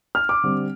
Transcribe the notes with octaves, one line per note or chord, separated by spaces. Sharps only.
F6
D6
D3 G3 C4